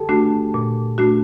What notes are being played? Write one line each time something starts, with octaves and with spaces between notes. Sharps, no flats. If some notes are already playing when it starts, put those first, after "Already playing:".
Already playing: G4 A4
A3 D4 F#4
A#2
A3 D4 F#4